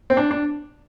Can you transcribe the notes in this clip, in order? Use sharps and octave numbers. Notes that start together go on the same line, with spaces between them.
C4
D4
D4